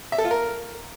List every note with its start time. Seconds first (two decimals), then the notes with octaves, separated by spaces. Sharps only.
0.12 E5
0.18 A4
0.25 F4
0.31 A#4